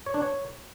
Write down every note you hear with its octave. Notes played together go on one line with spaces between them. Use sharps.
C#5
D4
C#5